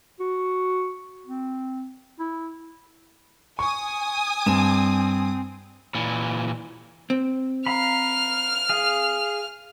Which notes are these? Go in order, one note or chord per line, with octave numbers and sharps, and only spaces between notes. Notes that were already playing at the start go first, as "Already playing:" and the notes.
F#4
C4
E4
G#5 C#6 D#6
G2 C4 E7
A#2 E3
C4
F5 A#5 B5 F6
G#4 F5